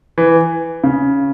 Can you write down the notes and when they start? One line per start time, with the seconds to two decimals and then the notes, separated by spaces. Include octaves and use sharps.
0.18 E3
0.84 C#3